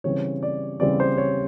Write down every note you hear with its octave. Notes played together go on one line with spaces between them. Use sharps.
C#3 E3 G3 C4 C#5
D5
C#3 E3 G3 C4 D5
C5
C#5